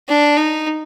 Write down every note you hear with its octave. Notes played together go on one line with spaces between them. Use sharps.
D4
D#4